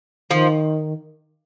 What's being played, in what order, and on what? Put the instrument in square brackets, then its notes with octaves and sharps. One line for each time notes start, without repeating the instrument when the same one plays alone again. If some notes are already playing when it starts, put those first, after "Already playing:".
[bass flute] D#3 [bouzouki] F3